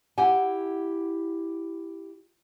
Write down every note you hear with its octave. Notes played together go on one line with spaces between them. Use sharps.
E4 G4 F#5 G#5